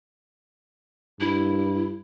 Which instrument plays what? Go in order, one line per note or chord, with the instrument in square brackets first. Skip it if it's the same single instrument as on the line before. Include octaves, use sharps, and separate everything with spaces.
[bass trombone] G2 [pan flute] E4